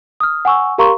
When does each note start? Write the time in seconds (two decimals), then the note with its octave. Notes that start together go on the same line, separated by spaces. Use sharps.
0.20 D#6 F6
0.45 F#5 G#5 C#6 E6
0.78 G4 A#4 F5 A#5 C6 C#6